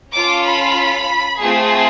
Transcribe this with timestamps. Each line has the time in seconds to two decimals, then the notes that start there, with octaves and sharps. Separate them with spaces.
0.13 C#4 F4 A4 D6
0.45 B5
1.41 A3 C4 F4 G#4